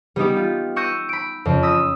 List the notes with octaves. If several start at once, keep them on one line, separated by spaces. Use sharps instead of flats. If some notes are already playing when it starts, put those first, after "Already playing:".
G3 B3 D#4 G4
F4
C#6 E6 F#6 G6 A#6 D#7
B5 D7
F2 C#3
B5 D#6 E6 A#6